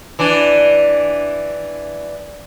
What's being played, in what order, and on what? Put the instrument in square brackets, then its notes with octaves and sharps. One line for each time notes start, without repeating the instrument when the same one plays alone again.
[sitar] E3 D4